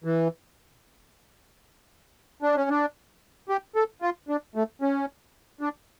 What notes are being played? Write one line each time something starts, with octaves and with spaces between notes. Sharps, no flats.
E3
D4
C#4
D4
G4
A4
F4
D4
A3
C#4
D4